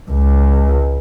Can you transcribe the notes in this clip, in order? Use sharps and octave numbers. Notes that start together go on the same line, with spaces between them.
C#2